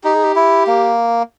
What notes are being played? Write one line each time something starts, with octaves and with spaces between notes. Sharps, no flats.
D#4 G4
G#4
G4
E4
A#3